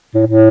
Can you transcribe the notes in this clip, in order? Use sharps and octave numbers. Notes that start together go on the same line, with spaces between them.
A2
A2